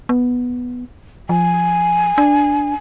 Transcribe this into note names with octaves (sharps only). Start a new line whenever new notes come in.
B3
F3 G#5
D4